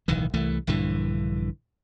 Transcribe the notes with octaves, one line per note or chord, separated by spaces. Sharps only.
D1 B1 D#3 E3
C2 E3 A3
A#1 G2 D3 E3